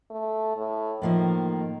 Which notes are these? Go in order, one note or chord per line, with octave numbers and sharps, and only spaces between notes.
A3
A2
A2 D#3 F3 A#3